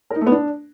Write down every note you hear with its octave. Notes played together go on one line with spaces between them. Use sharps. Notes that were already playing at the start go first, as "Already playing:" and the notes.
A#4
D#4
A3
B3
D4